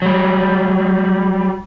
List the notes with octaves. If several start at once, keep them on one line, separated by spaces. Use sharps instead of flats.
F#3 G3